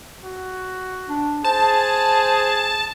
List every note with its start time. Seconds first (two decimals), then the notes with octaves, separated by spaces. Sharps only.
0.23 F#4
1.09 D4
1.44 G#4 C5 A5